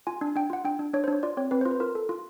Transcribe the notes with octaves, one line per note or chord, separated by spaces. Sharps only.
F4 G#5
D4
D4 G5
F4 F#5
D4 G5
D4
D4 C#5
C5
D4
C#5
F4 D5
C4 C#5
C4 B4
C5
F4
B4
F4 A#4
A4
F4